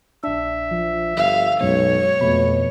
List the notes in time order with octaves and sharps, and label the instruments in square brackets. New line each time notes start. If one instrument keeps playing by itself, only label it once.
[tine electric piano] A#1 D4 [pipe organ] E5
[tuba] F3
[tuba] G1 [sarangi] F5
[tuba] B1 [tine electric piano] F#2 G#3 [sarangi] C#5
[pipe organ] F2 [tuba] B2 [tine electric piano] A3 B5